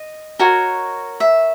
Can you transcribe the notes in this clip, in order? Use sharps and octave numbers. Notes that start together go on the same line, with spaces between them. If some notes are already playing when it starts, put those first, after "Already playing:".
Already playing: D#5
F#4 A#4 C#5
E5